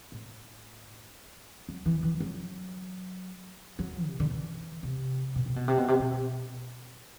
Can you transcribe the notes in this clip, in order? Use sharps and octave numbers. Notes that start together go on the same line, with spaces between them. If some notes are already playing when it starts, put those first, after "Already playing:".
A2
F#3
E3
E3
F#3
F#3
C3
D3
E3
C3
B2
C3
B2
C3
B2
C3
B2